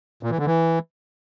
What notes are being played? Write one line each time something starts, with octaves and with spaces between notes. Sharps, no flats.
A#2
E3
D3
E3